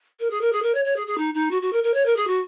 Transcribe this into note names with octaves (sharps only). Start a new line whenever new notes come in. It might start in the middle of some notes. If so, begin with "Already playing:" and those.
A#4
G#4
A#4
G#4
A#4
C#5
C#5
G#4
G#4
D#4
D#4
F#4
F#4
A#4
A#4
C#5
A#4
G#4
F#4